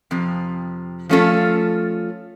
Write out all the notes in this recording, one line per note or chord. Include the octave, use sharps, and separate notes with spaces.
F2 C3 F3
F3 A3 C#4 F4 A4